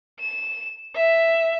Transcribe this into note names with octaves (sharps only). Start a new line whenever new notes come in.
E7
E5